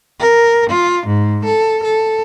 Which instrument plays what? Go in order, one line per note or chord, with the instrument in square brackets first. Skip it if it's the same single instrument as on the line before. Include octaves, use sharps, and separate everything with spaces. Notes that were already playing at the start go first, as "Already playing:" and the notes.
[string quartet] A#4
F4
G#2
A4
A4